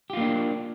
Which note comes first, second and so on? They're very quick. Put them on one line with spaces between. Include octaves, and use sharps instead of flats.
G4 F4 A#3 D4